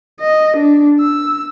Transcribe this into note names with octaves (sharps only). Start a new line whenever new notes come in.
D#5
D4
E6